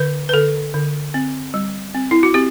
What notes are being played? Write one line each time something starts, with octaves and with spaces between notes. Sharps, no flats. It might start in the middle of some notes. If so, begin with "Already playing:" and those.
Already playing: D3 B4
B4
D3 A4
D3
C4
G3
C4
E4
F#4
C4 G4